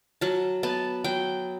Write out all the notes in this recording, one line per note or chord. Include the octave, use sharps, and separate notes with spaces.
F#3 A5
B3 A5
F#3 G5